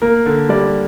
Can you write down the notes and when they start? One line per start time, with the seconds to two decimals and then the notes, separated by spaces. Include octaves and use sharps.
0.02 A#3 A#4
0.26 D3
0.49 G3 D5